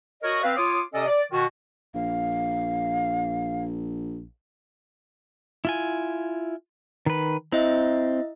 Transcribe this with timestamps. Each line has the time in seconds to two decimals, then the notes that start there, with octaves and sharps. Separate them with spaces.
0.23 F#4 A#4 C#5 D#5
0.43 C4 B4 F5
0.57 F4 C#5 D6 D#6
0.94 C3 C#4 A4 D5 D#5
1.07 D5
1.32 B2 D#3 F#4
1.95 A#1 F5
5.65 E4 F4 G#5
7.06 D#3 B4
7.52 C4 E4 D#5 E5